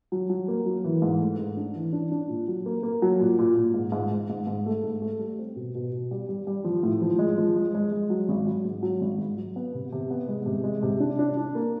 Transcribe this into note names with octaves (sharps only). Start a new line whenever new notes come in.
F#3
F#3
A#3
F#3
E3
G#2
A3
G#2
D4
E3
D4
D4
A#2
F#3
A#3
A#3
F#3
A#2
A#2
A#2
G#2
G#2
G#2
G#2
G#2
A3
G#2
A3
G3
C4
B2
B2
B2
G3
G3
G3
F3
A2
F3
G#3
F3
G#3
G#3
G#3
F#3
G#1
F#3
G#2
F#3
G#1
G#2
F#3
B3
C3
C3
B3
G#3
C3
G#3
C3
D4
D4
D4
A#3